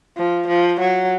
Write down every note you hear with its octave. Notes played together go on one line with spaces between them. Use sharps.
F3
F3
F#3